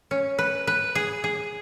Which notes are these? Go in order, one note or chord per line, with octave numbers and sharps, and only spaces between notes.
C#4
B4
B4
G#4
G#4